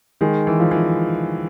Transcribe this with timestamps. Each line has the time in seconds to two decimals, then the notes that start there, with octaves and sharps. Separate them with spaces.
0.21 D#3 G#3
0.47 E3
0.60 F3
0.71 E3